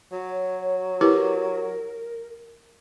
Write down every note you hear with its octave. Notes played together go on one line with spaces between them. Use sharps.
F#3 C#5
E4 G4 A#4 B4